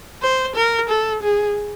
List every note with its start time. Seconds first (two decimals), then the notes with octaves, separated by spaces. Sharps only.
0.22 C5
0.56 A#4
0.89 A4
1.22 G#4